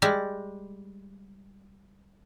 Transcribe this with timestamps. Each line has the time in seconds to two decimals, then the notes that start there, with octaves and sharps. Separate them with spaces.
0.02 G3 G#3